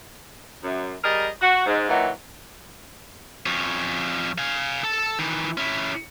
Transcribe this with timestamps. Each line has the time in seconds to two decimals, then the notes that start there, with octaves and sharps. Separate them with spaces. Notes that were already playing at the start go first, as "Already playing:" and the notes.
0.64 F#2
1.04 G3 G#4 A#4 D#5
1.42 F#4
1.66 G#2
1.89 A#2 D#3 E3 F#3
3.46 F2 C#4
4.38 F5 G#5
4.84 A4 A5
5.19 D#3 E3
5.58 C#4 E4